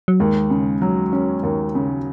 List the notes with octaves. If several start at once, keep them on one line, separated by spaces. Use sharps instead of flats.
F#3
D#2 G#3
C#3
F#3
C#4
D#2
C#3